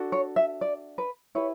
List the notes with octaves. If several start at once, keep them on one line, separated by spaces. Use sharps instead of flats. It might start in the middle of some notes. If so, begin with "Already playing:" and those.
Already playing: D4 F#4 A4
C#5
E5
D5
B4
E4 G4 B4 C#5